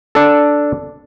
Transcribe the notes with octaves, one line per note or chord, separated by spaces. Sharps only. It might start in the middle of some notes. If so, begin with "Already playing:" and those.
D4 A4